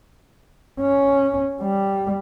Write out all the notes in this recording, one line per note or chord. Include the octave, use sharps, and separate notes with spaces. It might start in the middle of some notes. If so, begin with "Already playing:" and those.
C#4
G3